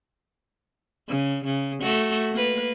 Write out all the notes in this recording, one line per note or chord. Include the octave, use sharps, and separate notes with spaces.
C#3
C#3
A3 F#4
A#3 B4